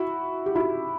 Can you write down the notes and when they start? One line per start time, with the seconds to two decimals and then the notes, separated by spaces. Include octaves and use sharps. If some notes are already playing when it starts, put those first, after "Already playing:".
Already playing: E4 F#4
0.46 G4
0.55 E4 F#4